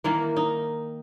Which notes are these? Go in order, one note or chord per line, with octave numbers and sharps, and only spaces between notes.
D#3 E3 A#3
D#4